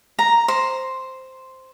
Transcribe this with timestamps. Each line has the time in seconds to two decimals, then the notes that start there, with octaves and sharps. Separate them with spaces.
0.19 A#5
0.48 C5